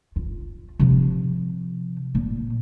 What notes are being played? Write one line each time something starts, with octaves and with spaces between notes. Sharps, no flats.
F4
C3 F3
A#2